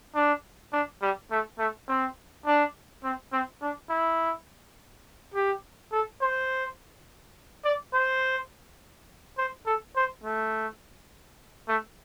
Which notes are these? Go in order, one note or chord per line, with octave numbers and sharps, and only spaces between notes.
D4
D4
G3
A3
A3
C4
D4
C4
C4
D4
E4
G4
A4
C5
D5
C5
C5
A4
C5
A3
A3